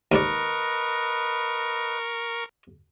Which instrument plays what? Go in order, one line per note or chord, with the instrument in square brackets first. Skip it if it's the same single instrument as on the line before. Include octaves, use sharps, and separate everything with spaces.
[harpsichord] D#2 G#2 D5 [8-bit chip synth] A#4 C#6 [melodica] B4 D#5